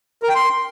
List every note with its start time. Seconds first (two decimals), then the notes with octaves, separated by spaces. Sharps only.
0.23 A#4
0.29 G5
0.35 C6